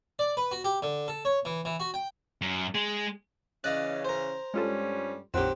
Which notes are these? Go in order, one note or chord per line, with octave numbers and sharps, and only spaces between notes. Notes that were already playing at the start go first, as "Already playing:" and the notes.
D5
B4
F#4
G4
D3
A4
C#5
E3
E3
F#4
G5
F#2
G#3
C#3 E3 C#4 D5 D#5 F5 F#6
A#4 C5
G2 G3 G#3 C#4 F4 A4
A#1 F2 D#3 F#3 C4 G4 F#5